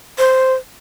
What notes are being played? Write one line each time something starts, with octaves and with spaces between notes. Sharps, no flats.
C5